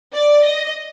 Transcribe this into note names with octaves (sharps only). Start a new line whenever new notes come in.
D5
D#5